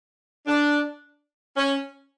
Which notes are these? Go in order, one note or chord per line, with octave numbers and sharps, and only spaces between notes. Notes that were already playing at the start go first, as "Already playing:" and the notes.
D4
C#4